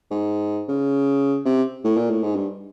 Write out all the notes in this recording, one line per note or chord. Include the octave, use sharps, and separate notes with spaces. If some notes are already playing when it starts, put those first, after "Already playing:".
G#2
C#3
C3
A2
A#2
A2
G#2
G2